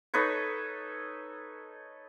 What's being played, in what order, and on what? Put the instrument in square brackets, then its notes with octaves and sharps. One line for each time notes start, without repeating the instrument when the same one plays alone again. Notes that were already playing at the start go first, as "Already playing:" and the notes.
[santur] D#4 A4 B4 C#5